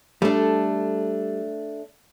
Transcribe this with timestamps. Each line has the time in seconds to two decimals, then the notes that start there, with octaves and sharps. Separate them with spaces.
0.22 G3 A3 D4 A4